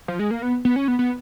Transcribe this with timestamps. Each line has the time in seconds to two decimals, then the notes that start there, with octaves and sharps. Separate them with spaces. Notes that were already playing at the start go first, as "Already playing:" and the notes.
0.08 F3
0.19 G#3
0.31 A#3
0.42 B3
0.65 B3
0.76 C#4
0.88 B3
0.99 B3